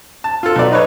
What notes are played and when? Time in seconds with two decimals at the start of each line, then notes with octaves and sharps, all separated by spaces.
0.24 A5
0.43 F4 A4
0.56 B1 D5
0.71 D#4 B4 C#5